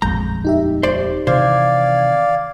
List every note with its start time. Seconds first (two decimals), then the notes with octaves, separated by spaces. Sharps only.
0.02 D#1 A1 F2 G#3 A#5 G6 A#6
0.45 D#4 G4 E5
0.83 C5 D5
1.27 C3 D#3 E3 C5 D5 F5 G#6